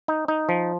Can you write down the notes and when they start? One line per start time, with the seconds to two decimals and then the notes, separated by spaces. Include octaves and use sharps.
0.08 D#4
0.28 D#4
0.49 F3